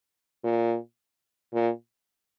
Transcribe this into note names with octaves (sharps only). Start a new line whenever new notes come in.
A#2
A#2